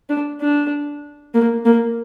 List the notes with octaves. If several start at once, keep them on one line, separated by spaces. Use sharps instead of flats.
D4
D4
A#3
A#3